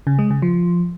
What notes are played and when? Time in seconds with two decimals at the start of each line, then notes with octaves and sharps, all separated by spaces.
0.07 C#3
0.19 G#3
0.30 C#3
0.42 F3